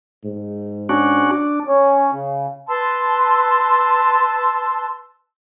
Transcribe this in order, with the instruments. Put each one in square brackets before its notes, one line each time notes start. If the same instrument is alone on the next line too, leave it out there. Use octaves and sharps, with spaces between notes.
[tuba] G#2
[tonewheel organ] C#4 D4 F#4
D4
[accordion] C#4
C#3
[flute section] B4 A5 C6 E6